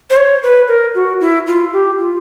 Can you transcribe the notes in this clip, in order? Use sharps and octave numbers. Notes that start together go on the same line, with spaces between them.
C5
C#5
B4
A#4
F#4
E4
F4
G4
F4